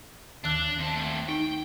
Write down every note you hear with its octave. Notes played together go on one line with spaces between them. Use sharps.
D#2 D#3 D4 F#6
F2 A5
A3 C4
D#4 G5